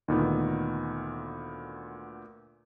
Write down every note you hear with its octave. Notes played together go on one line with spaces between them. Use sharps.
D2 A#2 D#3 B3